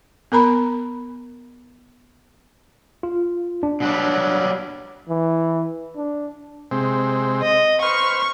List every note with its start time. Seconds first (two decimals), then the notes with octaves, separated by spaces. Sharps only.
0.32 B3 A#4 A#5 B5
3.03 F4
3.63 D4
3.80 B2 F#3 G3
5.09 E3
5.96 D4
6.71 C3 G#3 C4
7.43 D#5
7.82 B4 C5 C#6 F6